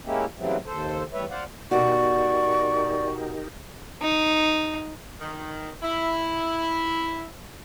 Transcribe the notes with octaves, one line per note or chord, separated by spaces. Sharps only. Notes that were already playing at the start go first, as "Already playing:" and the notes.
G#3 A#3 C#4 E4 G4
C#3 E3 F#3 G3 A3 C4
D#2 A4 C5
E2 G3 A3 B4 C#5 E5
C5 D5 F5 F#5
B2 D#4 F#4 G4 A#4 D5 C#6
D#4
D#3
E4